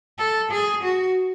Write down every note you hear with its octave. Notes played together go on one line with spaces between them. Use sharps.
A4
G#4
F#4